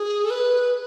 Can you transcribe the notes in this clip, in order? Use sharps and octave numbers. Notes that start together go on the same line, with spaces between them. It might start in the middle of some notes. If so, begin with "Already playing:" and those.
Already playing: G#4
A4
B4